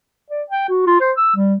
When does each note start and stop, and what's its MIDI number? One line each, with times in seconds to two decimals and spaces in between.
0.30 0.42 74
0.50 0.63 79
0.69 0.85 66
0.86 0.99 65
1.00 1.11 72
1.17 1.35 88
1.36 1.55 55